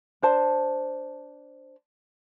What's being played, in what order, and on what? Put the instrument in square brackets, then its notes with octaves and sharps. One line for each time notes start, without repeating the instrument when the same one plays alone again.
[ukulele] D4 C5 A5